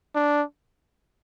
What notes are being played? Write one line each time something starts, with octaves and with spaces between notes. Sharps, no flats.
D4